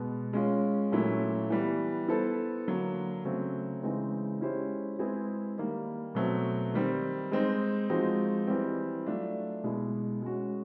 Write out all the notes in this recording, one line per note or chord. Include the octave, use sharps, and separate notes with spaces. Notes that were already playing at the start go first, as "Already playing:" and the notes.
Already playing: B2 G#3 B3
G#3 C#4 F4
A#2 F#3 A3 C#4 E4
E3 G3 B3
B3 E4 A4 C5
D3 F#3 A#3
C#3 F#3 A3 C4
C#3 E3 G#3 C4 D#4
G#3 C#4 E4 G4 C5
G#3 C4 E4 G#4 B4
D#3 G3 A#3
B2 F#3 A3 C4
D#3 G3 C4
G#3 C4 D#4
F3 G#3 C4 D#4 F#4
E3 G3 C4
F#3 A3 D4 F4
B2 G#3 B3 E4
G#3 C#4 F#4